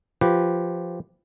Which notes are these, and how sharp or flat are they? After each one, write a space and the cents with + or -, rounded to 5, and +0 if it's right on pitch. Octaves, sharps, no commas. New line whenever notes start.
F3 +0 G4 +0 B4 +0